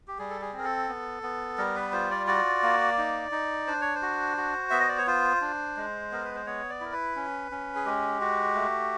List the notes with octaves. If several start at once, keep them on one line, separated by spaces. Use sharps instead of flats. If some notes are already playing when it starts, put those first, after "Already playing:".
G4
G3 G#4
A4
G#4
C4
A#4
A4
B3
B3
G3 A#4
B4
F4 C5
D5
F#4 D5
A#3
D#4
D#4
D4 C5
C#5
C5
F#4
F#4
B3 E5
D#5
D5
C#5
F4 C5
D4
G#3
B3 A#4
B4
C5
B3 C#5
D5
E4 A#4
B4
C#4
C#4
G#4
G#3 G4
F#4
A3